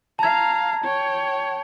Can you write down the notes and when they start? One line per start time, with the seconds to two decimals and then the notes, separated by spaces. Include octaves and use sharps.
0.19 F5 A5 A#5 G#6
0.84 C#5 G5